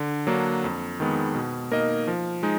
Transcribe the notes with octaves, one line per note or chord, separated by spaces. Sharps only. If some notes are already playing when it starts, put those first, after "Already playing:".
Already playing: D3
F#3 A#3 D4
F2
D#3 G#3 B3
B2
A#3 D#4 A#4 D#5
F3
G#3 D#4